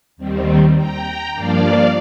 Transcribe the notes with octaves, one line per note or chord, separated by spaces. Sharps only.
D#2 D#3 G3 C4
G5 A#5
G2 F3 A#3 D4 D5 F5